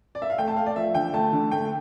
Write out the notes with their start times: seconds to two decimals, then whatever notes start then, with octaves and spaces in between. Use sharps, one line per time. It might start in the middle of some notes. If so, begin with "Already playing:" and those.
0.15 D5
0.22 E5
0.30 F5
0.38 A3 G5
0.48 A5
0.56 A3 F5
0.66 D5
0.76 F3 E5
0.94 D3 G5
1.13 A3 A5
1.33 D3
1.52 A3 G5